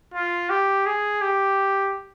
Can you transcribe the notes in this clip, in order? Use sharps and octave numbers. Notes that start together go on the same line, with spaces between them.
F4
G4
G#4
G4